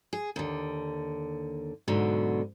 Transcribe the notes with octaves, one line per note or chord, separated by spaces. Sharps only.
G#4
D#2 D3
G#2 B2 D3 F#3